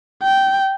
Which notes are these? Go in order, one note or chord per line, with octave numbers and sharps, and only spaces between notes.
G5